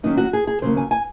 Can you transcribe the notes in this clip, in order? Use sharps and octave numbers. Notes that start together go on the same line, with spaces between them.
D#2 D#3 F#3 C#4 D#4
F#4
G#4
G#4
D#2 C#3 F#3 A#3 C5
G#5
G#5